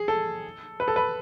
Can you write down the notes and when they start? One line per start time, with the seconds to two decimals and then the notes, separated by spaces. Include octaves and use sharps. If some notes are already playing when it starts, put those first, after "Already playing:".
Already playing: G#4
0.08 A4
0.80 B4
0.88 A4
0.96 B4